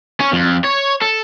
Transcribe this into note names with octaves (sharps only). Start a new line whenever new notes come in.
C#4
F2
C#5
A4